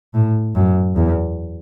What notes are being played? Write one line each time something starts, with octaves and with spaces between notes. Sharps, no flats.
A2
F#2
E2